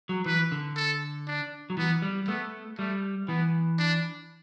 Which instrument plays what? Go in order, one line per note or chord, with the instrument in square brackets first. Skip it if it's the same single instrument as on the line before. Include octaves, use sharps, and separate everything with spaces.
[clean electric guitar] F#3
[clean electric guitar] E3 [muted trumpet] B4
[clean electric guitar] D3
[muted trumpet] A4
D4
[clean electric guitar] F#3
[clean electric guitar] E3 [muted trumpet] B3
[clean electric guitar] G3
[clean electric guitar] A3 [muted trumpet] B3
[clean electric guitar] G3 [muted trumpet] A3
[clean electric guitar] E3 [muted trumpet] B3
[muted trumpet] D4